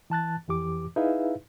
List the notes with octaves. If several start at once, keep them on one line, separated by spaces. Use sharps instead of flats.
E3 A5 F#6 A6
F2 E3 G4 D6
D#4 E4 G#4 B4 E5 F5